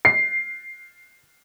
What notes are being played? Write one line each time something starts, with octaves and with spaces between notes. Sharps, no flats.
C7